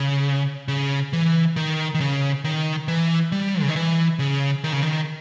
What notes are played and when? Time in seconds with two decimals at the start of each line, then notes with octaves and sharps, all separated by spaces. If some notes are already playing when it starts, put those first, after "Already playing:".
Already playing: C#3
0.68 C#3
1.13 E3
1.56 D#3
1.94 D#3
2.00 C#3
2.44 D#3
2.88 E3
3.32 G3
3.61 C#3
3.69 D#3
3.76 E3
4.19 C#3
4.64 D#3
4.72 C#3
4.82 D#3